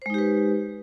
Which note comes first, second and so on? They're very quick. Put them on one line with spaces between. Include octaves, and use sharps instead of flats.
C5 G#3 D#4 G4 B4